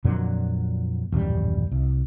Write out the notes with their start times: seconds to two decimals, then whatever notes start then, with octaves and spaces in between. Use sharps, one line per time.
0.04 F2 A#2 D3 F#3
1.12 D#1 A1 F#2 G3
1.71 C2